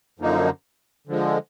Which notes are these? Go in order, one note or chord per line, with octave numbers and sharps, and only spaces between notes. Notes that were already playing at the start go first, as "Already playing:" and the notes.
F#2 D3 F3 A#3 D#4
D3 F3 G#3